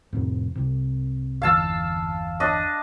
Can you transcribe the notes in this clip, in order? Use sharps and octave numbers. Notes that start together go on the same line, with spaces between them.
F2 A2 C3
C2 C3
G1 E2 F5 A5 E6
D4 D#5